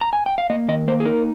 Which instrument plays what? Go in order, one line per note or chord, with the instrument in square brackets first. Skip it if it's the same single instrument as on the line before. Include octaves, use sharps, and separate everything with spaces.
[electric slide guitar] A#5
G#5
G5
F5
A#3 D#5
D#3 D#5
A#3 C5
G#4
D#4 A#4